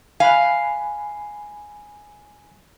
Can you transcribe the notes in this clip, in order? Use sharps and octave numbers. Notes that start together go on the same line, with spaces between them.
F5 G#5 B5 F#6